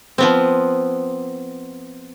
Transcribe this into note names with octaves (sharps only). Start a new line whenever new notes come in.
F3 B3 C4